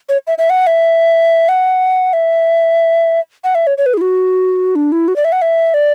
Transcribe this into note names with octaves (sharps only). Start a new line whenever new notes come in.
C#5
E5
E5
F#5
E5
F#5
E5
F#5
E5
C#5
C#5
B4
G#4
E4
F#4
D4
E4
F#4
D5
E5
F#5
E5
D5